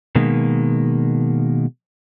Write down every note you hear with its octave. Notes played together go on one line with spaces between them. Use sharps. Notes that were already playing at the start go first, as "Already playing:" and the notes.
B2 D#3 G#3 A#3